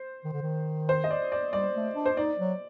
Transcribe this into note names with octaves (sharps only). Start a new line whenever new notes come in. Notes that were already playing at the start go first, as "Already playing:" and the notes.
Already playing: C5
D#3
D3
D#3
C5
D#5
D5
D5
G3 D5
A3
D4
C5
D#4 D5
F#3